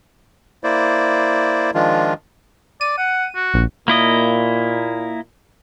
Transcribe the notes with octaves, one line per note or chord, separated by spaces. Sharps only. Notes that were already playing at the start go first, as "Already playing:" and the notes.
A#3 E4 C5 D5
D#3 F3 G#3 D4 F4
D5 D#7
F#5
F#4
A#1
A#2 A#3 E4 D#5